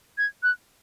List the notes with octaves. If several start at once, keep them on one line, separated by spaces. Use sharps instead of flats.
G#6
F#6